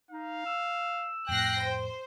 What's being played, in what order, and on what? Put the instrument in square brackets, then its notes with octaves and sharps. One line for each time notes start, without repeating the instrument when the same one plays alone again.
[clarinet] D#4 [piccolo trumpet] F5
[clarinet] E6
[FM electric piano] F2 A2 [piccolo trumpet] G5 [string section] F#6 A#6 C7
[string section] C5